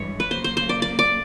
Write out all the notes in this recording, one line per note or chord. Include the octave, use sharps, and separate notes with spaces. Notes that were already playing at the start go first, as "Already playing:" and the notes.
Already playing: G2 E3 G#3 C#5
B4
C#3 F#3 A#3 C5
C5
C5
D5
D5
D5